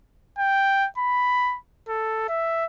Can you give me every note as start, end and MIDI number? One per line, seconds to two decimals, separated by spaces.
0.38 0.87 79
0.98 1.57 83
1.89 2.25 69
2.29 2.65 76